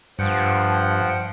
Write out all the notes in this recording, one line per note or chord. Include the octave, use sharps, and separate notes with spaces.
G2 F3 F#5 G5